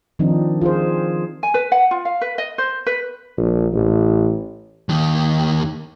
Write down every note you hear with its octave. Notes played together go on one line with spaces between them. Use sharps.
D#3 F3 C4 D4 D#4
F4 G#4 C5
G#5
B4
F#5
F4
F5
B4
D#5
C5
B4
A#1
A1
D#2 D#3